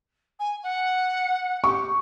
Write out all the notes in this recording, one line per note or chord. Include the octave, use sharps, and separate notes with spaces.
G#5
F#5
G4 C#6